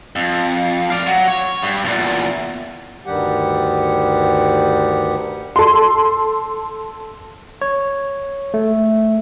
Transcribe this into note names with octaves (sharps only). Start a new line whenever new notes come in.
F2
D5 F5
F#3
C#5
G2
E2 A#2
D2 G2 D#3 G3 G4 F#5
A4 C6
C#5
A3